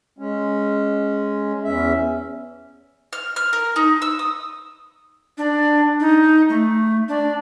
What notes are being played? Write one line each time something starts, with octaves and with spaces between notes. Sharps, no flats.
G#3 C#4
E2 C#4 E5
F6
F6
A#4
D#4
E6
D#6
D4
D#4
A3
D4